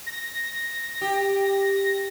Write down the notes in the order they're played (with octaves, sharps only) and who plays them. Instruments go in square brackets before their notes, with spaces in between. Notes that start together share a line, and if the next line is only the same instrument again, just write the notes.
[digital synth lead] A#6
[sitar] G4